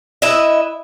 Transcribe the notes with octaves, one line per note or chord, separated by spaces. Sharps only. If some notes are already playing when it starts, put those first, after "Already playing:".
E4 B4 D#5 E5